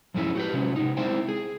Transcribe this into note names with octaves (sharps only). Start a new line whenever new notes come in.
F2 G#2 G#3 A3 C#4 E4
F#4 G4 B4
C3 F#3 G#3 C#4
C3 D#4
G#3 C4 E4 C5 G5
G#4